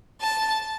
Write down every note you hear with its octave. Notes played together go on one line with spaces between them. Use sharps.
A5